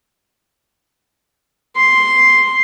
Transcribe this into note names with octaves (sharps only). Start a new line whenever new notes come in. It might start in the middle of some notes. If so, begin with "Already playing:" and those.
C6